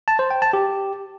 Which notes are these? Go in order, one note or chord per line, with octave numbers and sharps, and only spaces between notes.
A5
C5
G5
A5
G4